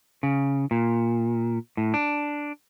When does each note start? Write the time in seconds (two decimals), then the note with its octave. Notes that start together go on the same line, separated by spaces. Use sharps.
0.23 C#3
0.71 A#2
1.77 A2
1.94 D4